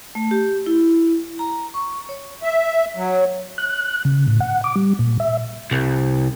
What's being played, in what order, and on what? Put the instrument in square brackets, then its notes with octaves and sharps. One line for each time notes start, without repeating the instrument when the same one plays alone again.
[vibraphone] A3
G4
E4
A#5
C#6
C#5
[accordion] E5
F#3
[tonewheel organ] F#6
C#3
A2
F#5
D6
G3
A#2
E5
[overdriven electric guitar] C2